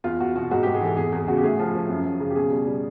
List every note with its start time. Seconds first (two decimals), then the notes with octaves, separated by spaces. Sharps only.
0.04 E2 F4
0.19 E2 F#4
0.36 B2 F#4
0.51 G#2 F#4
0.63 G4
0.67 G#2
0.74 G#4
0.81 E3 A4
0.97 E2 G#4
1.12 E2 G#4
1.27 C#3 F#4
1.37 G4
1.43 A2 G#4
1.59 F3
1.75 F3
1.89 F#2
2.05 F#2
2.20 C#3
2.30 G4
2.36 B2 G#4
2.51 G3
2.66 G3